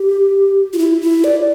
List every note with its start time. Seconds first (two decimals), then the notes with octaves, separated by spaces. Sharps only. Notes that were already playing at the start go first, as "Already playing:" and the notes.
Already playing: G4
0.73 F4
0.78 E4
1.01 E4
1.24 D5